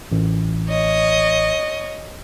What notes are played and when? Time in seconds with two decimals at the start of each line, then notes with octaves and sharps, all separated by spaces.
0.12 A1
0.69 C#5 D#5